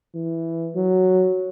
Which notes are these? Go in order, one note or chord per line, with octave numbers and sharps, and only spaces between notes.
E3
F#3